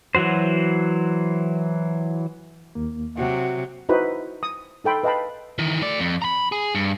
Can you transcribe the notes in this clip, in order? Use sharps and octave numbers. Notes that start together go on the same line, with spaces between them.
E3 F#3 F#4 C5
D#2 A#3
C3 F#3 F#4
D#4 E4 F#4 B4 C5
D#6
D#4 A4 G5 B5 C6
B4 D#5 F5 G5 A5 B5
D#3 E3
A3 D5
F2
A#5 B5
G#4
G2